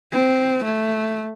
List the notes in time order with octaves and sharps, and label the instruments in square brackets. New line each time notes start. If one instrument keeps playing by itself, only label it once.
[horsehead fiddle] C4
A3